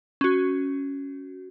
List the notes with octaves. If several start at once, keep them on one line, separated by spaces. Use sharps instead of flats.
C#4 F#4